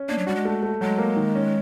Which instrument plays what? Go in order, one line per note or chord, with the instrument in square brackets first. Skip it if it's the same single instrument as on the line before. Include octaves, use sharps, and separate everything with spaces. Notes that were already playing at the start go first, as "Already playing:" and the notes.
Already playing: [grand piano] C#4
[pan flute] A#3 [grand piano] D4
[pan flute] F#3
[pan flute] G3 [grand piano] F#4
[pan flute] G#3
[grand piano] A3
A3
[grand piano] F#3 [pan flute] G#3
[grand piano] A#3
D#3
C#4